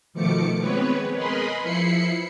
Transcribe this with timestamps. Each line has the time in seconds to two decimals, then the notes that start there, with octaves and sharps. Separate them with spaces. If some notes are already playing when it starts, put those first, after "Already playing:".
0.13 B2 D#3 F3 A3 D6 C#7
0.60 G#3 B3 C4 B4 C#5
1.14 G#4 A#4 B4 D#5 B5 C6
1.62 F3 E4 B5 C7 C#7